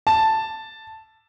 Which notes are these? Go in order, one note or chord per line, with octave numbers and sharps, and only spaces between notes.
A5